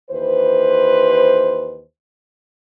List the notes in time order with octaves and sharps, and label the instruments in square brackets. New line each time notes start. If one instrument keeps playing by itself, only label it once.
[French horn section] D#2 E3 B4 C5